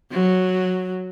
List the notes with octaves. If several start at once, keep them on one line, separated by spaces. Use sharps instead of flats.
F#3